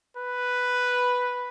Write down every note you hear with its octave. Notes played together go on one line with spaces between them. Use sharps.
B4